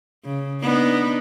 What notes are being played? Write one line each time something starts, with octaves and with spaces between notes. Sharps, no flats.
C#3
B3 D4 D#4